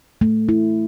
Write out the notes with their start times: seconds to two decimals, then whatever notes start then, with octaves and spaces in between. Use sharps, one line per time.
0.21 A3
0.49 E4